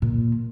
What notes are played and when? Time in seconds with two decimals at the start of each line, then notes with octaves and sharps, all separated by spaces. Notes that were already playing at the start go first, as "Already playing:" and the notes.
0.02 A#2